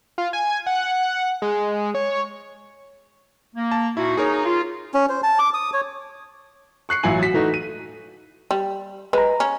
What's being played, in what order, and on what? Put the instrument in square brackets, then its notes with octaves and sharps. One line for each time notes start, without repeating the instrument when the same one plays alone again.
[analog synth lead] F4
G#5
F#5
G#3
C#5
[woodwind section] A#3
[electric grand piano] A5
[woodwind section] A#2 D#4 F#4 [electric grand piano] E4
[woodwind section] D#4 [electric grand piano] G#4 A#4 C#5
[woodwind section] F4
[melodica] C#4
C5
A5
D6
D#6
C#5
[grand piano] C#6 F#6 C7 C#7
A1 F#3 E4 F4 G#5 F#7
F#4 B6
E3 A3 D#4 F#4
D#7
[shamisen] G3
[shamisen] G#3 [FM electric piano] B4 A#5
[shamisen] C#4